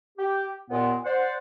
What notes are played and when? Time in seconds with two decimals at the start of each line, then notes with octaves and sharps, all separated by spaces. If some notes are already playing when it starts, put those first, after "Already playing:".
0.18 G4
0.70 D#2 A#2 B3
1.04 C5 D5 F#5